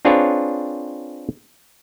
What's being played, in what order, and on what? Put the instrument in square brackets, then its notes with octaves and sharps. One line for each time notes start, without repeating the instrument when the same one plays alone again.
[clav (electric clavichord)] C4 D4 F4 G#4 B4 C#5